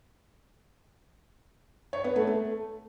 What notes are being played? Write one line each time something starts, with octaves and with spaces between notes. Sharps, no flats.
C#5
B3
A3
A3